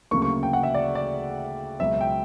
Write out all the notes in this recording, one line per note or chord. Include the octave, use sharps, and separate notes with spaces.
D2 C#3 F#3 A#3 C#6
C#6
G5
F#5
E5
D5
D5
C#2 B2 F#3 B3 E5
G5